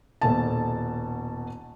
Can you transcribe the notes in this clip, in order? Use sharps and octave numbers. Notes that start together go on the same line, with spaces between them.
D#1 B2 A5